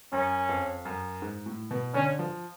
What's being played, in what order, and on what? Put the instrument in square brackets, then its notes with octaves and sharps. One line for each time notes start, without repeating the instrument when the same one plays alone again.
[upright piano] F#2 [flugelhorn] C#4
[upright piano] F2
F#2
G#2
A2
B2
[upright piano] D3 [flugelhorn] C#4
[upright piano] F3